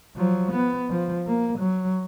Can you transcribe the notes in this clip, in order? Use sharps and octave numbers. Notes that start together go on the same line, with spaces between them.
F3 F#3
B3
F3
A#3
F#3